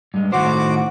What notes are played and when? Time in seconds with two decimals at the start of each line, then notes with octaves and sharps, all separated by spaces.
0.14 G2 G#3
0.32 A2 D#3 F#4 C5 D6